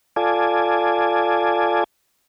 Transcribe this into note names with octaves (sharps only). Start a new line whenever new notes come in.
F4 A4 D5 G#5